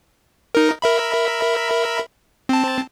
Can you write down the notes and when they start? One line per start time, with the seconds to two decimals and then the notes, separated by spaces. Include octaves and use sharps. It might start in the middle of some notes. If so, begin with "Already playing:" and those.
0.55 D#4 A#4
0.82 A#4 E5 B5
2.49 C4 A5